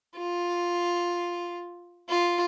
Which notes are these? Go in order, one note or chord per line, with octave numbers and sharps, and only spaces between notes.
F4
F4